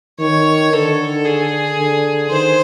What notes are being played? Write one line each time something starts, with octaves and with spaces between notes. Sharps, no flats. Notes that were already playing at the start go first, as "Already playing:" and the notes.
D#3 C#5
D3 A4
G#4
D3
D#3 C5